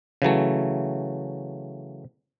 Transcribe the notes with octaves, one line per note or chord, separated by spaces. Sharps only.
C#3 E3 F#3 A3